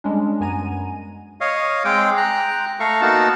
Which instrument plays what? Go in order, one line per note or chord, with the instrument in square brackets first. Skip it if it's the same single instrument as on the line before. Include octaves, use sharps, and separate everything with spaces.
[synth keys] G3 G#3 C#4 D4
F#2 B3 G#5 A#5 D#7
[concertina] C#5 D#5 F5
G#3 C4 G5 D6
G5 A#5 F#6
A3 A4 F5 A#5 C#6
A#3 B3 D#4 F#4 A5